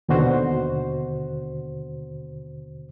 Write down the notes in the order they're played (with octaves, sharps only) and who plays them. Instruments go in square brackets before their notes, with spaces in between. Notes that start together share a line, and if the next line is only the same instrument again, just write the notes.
[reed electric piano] D#2 B2 D3 F#4 C5